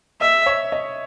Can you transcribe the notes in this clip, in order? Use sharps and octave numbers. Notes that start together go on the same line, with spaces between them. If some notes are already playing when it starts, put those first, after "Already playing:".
D#5 E5
C#5 E5
D#5